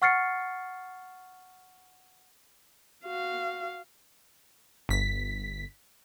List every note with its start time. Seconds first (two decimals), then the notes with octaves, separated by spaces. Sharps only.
0.02 F#5 C#6 F6 A6 C7 C#7
3.05 F#4 F5
4.89 G1 B6